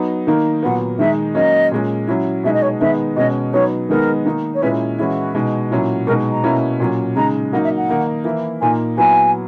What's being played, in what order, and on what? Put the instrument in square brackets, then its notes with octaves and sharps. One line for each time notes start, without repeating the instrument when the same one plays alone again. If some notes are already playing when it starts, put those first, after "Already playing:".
Already playing: [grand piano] F#3 B3 D#4
D#3 A#3 D#4
[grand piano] A#2 F#3 B3 [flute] F#5
[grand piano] D#3 G#3 D#4 [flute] E5
[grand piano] F#3 A#3 C#4 [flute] D#5
[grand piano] A#2 G#3 C#4
F#3 C#4 E4
[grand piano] B2 G#3 D#4 [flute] E5
[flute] D#5
C#5
[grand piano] D#3 G#3 B3 D#4 [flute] E5
[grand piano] B2 G#3 C#4 [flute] D#5
[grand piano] F#3 B3 D#4 [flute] C#5
[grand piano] D#3 G#3 B3 D#4 [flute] A#4
[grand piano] D#3 A#3 D#4
[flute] C#5
[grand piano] A#2 G#3 C#4 E4 [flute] B4
[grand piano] E3 G#3 C#4 E4 [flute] F#4
[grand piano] B2 G#3 D#4
A#2 F#3 C#4 E4
[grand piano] B2 G#3 D#4 [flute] A#4
[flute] A#5
[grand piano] B2 A#3 C#4 E4
A#2 F#3 C#4
[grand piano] C#3 G#3 D#4 [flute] A#5
[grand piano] F#3 A#3 D#4 [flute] F#5
[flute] E5
F#5
[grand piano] D#3 A#3 D#4
E3 A#3 E4
[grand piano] A#2 A#3 D#4 [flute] G#5
[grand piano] F#3 B3 E4 [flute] G#5